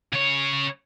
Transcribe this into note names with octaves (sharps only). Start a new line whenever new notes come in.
C#3 C#5